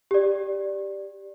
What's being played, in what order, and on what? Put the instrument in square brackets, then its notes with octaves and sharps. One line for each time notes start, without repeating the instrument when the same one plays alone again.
[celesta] G4 D5